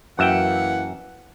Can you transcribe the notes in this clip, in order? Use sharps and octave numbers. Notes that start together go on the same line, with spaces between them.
F#2 E3 A#3 E5 F#5 G5